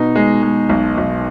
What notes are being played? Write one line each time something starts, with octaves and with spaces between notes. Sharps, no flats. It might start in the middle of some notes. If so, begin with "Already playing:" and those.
Already playing: B2 D#4
G#3
G#3
B1
B1